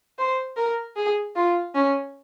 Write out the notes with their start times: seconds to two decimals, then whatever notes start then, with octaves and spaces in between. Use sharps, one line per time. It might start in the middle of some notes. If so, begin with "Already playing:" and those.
0.19 C5
0.57 A#4
0.96 G#4
1.36 F4
1.75 C#4